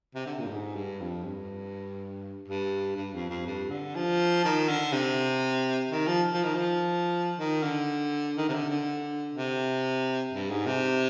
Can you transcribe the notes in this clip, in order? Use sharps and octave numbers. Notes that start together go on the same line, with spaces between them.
C3
D3
A#2
G2
G#2
G2
F2
G2
G2
G2
F2
F2
G2
D3
F3
D#3
D3
C3
D#3
F3
F3
D#3
F3
D#3
D3
D#3
C3
D3
D3
C3
G2
G#2
C3